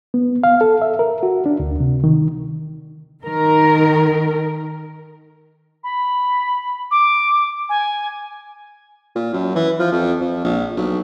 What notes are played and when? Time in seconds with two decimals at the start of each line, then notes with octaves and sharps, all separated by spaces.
0.14 B3
0.44 F5
0.61 A4
0.82 E5
0.99 A#4
1.23 F#4
1.46 D4
1.60 D2
1.80 C3
2.04 D#3
3.24 D#3 A#4
5.84 B5
6.91 D6
7.69 G#5
9.15 A#2
9.33 F#2
9.55 E3
9.79 F3
9.92 F2
10.21 F2
10.44 A#1
10.77 B1